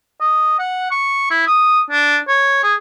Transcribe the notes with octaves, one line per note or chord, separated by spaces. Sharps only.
D#5
F#5
C#6
E4
D#6
D4
C#5
G#4